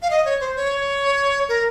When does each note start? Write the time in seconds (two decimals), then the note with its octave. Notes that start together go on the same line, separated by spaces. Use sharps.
0.02 F5
0.10 D#5
0.25 C#5
0.40 C5
0.56 C#5
1.49 A#4